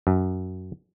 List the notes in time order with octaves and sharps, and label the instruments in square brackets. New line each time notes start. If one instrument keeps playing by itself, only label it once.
[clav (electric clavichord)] F#2